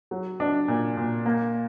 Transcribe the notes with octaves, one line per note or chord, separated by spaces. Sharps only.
F#3
D4
A#2
A#2
A#3